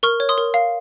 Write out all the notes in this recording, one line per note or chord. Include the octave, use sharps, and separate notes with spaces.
A#4 C#6 F6
C#5
C6 D#6
A#4
F5